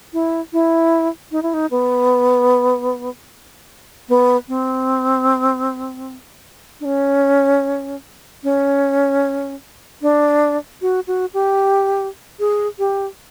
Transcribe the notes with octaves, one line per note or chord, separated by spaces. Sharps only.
E4
E4
D#4
E4
D#4
B3
B3
C4
D4
C#4
C#4
D4
F#4
F#4
G4
G#4
G4